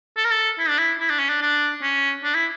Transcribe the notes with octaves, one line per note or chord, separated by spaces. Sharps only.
A4
A#4
A4
E4
D4
E4
E4
D4
C#4
D4
D4
C#4
D4
E4